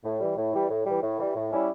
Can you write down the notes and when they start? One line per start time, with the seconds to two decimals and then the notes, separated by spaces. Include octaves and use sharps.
0.04 A2
0.20 E3 G3
0.37 A2
0.53 E3 G3
0.70 A2
0.86 G3
0.91 E3
1.02 A2
1.19 E3 G3
1.35 A2
1.52 G3 C#4 E4